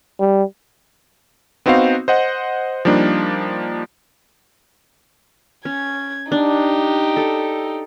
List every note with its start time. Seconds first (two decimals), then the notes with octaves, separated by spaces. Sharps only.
0.19 G3
1.66 B3 C4 D#4 F#4 C5 F5
2.08 C5 D#5 F#5
2.85 F3 G3 A#3 D4 D#4
5.65 C#4 G#6
6.32 D4 D#4 G4
7.17 A4